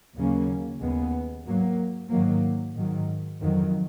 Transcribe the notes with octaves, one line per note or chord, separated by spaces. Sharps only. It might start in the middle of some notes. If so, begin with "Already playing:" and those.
D#2 C#3 F#3 A#3 C#4
D#2 C#3 G#3 B3
G#2 F#3 A#3
G#2 D#3 F#3 A#3
G#2 D#3 F#3
F2 D#3 F#3